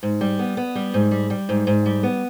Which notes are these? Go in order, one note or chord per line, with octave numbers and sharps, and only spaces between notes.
G#2
G3
B3
B3
G3
G#2
G3
G3
G#2
G#2
G3
B3